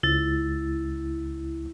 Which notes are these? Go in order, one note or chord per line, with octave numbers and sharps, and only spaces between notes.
C#2 E4 A6